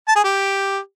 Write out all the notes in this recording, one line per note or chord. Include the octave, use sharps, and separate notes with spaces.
A5
G#4
G4